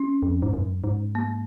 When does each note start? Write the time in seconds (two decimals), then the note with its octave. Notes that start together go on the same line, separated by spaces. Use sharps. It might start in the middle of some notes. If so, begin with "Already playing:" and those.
Already playing: C#4
0.23 F2
0.42 G#2
0.53 F#2
0.84 G#2
1.15 A#3